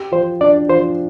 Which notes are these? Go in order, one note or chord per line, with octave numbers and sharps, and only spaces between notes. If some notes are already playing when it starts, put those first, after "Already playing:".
Already playing: G4
F3 C5
D4 D5
F3 C5